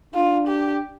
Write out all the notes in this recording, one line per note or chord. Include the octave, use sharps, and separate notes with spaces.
D4 F4
G4